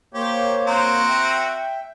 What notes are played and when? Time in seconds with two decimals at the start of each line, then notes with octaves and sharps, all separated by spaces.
0.14 A#3 G4 C5 C#5
0.67 C4 F#4 A#5
1.09 E5 G5